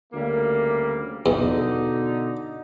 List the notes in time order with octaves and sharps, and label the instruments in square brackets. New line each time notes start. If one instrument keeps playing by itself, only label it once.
[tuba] D2 [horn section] C#3 G3 A#3
[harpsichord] E2 [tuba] B2 [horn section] D3 D#4